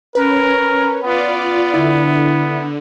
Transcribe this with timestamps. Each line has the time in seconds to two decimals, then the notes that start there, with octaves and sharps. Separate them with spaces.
0.15 C#4 A#4 B4
1.02 B3 F4 D5
1.74 D3 E4